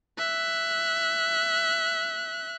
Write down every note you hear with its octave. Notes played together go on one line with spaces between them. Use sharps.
E5 F#6